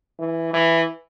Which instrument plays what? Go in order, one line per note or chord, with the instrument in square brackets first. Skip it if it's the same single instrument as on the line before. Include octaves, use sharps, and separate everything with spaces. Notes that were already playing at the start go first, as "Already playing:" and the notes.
[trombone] E3
E3